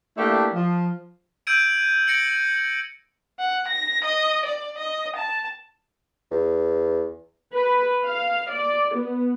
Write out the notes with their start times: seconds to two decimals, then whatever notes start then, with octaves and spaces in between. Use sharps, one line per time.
0.17 A3 A#3 D4 E4 G4
0.54 F3
1.47 E6 G6 G#6 D7 D#7
2.07 A#6 C#7 D7 F#7
3.39 F#5
3.68 A#6
4.04 D#5
4.46 D5
4.78 D#5
5.16 A5
6.31 E2
7.54 B4
8.05 F5
8.51 D5
8.96 B3